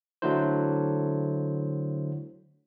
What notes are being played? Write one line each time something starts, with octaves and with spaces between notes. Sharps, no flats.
D3 F#3 A3 D4 E4 C5